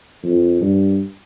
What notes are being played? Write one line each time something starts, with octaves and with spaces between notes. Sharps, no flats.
F2
G2